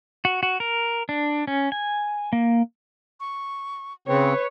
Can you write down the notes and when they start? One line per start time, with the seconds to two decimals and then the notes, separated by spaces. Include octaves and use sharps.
0.25 F#4
0.43 F#4
0.60 A#4
1.09 D4
1.47 C#4
1.72 G#5
2.33 A#3
3.20 C#6
4.08 C#3 C4 B4 C#5